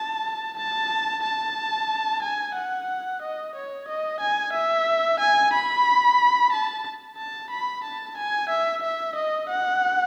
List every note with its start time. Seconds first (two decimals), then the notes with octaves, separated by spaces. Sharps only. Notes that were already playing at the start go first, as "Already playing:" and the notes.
Already playing: A5
0.57 A5
1.23 A5
2.22 G#5
2.55 F#5
3.22 D#5
3.55 C#5
3.88 D#5
4.20 G#5
4.53 E5
5.19 G#5
5.53 B5
6.52 A5
7.17 A5
7.50 B5
7.84 A5
8.17 G#5
8.49 E5
8.83 E5
9.15 D#5
9.49 F#5